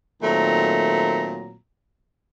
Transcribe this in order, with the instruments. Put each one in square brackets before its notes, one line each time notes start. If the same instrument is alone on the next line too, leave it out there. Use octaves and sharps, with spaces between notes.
[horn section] A#2 D#3 F#3 A3 C4 A#5